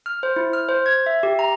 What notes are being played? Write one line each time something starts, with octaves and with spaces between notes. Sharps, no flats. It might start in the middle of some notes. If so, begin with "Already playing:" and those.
F6
C5
E4
F6
C5
G#6
E5
G4
A#5